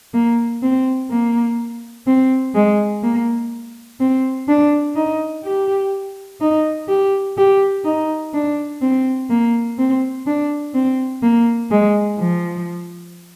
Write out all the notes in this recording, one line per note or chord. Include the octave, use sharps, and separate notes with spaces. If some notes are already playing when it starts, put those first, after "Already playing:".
A#3
C4
A#3
C4
G#3
A#3
C4
D4
D#4
G4
D#4
G4
G4
D#4
D4
C4
A#3
C4
D4
C4
A#3
G#3
F3